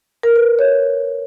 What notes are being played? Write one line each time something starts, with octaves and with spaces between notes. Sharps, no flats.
A#4
B4
C#5